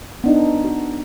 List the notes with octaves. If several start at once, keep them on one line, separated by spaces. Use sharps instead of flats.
B3 D4 D#4
F#4